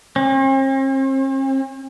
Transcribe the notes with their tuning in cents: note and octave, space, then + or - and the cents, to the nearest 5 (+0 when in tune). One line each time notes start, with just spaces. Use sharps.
C4 +45